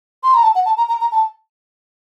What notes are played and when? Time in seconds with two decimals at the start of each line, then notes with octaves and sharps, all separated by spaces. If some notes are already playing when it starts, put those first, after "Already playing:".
0.23 C6
0.34 A#5
0.43 A5
0.55 F#5
0.66 A5
0.77 A#5
0.89 A#5
1.01 A#5
1.12 A5